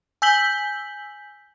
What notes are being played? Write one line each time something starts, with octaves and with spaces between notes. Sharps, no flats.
G#5 E6 G6 B6 F#7 G7